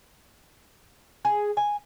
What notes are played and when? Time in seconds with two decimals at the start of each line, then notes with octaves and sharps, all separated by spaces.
1.25 G#4
1.57 G#5